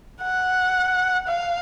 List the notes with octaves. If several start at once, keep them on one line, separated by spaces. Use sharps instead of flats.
F#5
F5